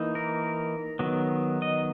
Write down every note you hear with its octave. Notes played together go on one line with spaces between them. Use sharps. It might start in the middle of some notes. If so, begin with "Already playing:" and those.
Already playing: E3 A#3 D#4
A#4
D#3 F#3 B3
D#5